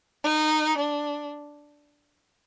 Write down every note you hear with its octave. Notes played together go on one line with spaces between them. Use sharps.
D#4
D4